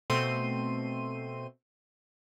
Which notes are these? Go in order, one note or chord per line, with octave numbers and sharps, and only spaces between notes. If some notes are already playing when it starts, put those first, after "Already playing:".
B2 A3 C4 C6 D#7